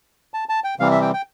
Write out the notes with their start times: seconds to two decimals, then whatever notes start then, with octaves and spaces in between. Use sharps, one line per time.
0.34 A5
0.49 A5
0.64 G5
0.79 C3 E3 G3 C4 F5
0.92 E5
1.02 G5
1.14 G5